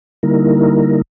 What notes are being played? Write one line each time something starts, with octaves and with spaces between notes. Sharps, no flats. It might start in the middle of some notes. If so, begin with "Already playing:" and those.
D3 G3 A#3 D#4 E4 A#4